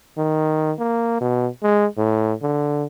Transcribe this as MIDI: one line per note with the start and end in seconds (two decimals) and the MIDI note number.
0.18 0.72 51
0.79 1.18 58
1.21 1.48 47
1.62 1.86 56
1.97 2.33 45
2.42 2.85 50